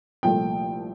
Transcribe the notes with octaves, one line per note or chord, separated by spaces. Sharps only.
C2 A#2 F3 A3 G5